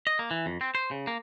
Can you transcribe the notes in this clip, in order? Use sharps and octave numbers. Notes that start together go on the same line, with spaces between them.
D#5
A#3
E3
F2
C4
C5
C#3
A#3